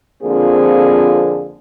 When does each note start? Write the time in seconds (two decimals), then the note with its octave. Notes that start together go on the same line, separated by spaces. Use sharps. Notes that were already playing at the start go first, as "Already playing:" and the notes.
0.23 F2 D3 A#3 C4 F4 G#4